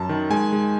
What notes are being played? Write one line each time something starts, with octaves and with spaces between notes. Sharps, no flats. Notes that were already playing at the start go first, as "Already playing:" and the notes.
Already playing: F#2 A5
D#3
G#3 G#5
G#3